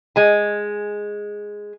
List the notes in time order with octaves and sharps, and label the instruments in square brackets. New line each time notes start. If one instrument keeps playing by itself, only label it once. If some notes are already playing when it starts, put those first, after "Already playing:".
[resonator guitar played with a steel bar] G#3 G#5